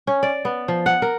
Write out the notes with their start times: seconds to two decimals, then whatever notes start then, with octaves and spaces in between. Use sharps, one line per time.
0.07 C#4
0.23 D5
0.45 B3
0.68 F3
0.86 F#5
1.02 A#4